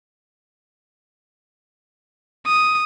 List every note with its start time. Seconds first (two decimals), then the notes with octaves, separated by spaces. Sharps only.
2.46 D#6